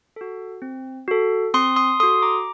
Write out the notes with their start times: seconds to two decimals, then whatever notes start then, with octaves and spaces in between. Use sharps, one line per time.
0.16 F#4 A4
0.62 C4
1.08 F#4 A4
1.54 C4 C6 D#6
1.76 C6 D#6
2.00 F#4 A4 C6 D#6
2.22 A#5 D6